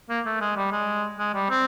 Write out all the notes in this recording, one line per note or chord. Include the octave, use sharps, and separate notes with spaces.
A#3
A3
G#3
G3
G#3
G#3
G3
C4